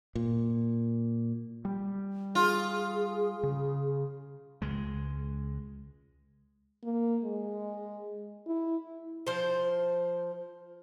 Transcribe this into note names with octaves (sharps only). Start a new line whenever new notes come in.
A#2
G3
F4 G#4
C#3
C#2 G#3
A#3
G#3
E4
F3 C5